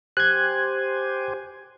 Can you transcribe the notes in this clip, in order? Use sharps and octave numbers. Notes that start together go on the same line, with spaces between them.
G4 C5 G#5 F#6 G#6